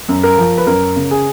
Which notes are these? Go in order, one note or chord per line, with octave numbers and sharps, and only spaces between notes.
F#2
A#4
F3
B4
F#2 A#4
C#3
G#4